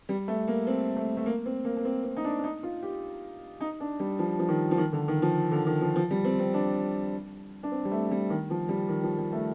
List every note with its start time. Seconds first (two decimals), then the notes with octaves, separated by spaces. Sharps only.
0.09 G3
0.28 A3
0.48 A#3
0.67 C4
0.97 A3
1.17 A3
1.26 A#3
1.46 C4
1.65 A#3
1.77 A#3
1.85 C4
2.04 C4
2.17 D#4
2.24 D4
2.39 D4
2.44 D#4
2.63 F4
2.82 G4
3.60 D#4
3.80 D4
4.00 G3
4.19 F3
4.39 F3
4.49 D#3
4.71 F3
4.78 D#3
4.93 D3
5.08 D#3
5.22 F3
5.52 D3
5.67 D#3
5.81 F3
5.96 F3
6.11 G3
6.25 C4
6.39 C4
6.54 D4
7.63 D4
7.71 C4
7.85 G3
7.92 A3
8.11 G3
8.30 D#3
8.50 F3
8.69 G3
8.89 D#3
9.03 F3
9.18 G3
9.33 A3